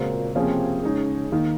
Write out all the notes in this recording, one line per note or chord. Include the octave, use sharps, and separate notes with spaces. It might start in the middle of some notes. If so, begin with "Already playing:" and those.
Already playing: A#2 C#3 G#3 A#3 C4 F#4
C3 F3 A#3 C4 C#4 G#4
C#3 G#3 C#4 D#4 G#4
D#3 A#3 D#4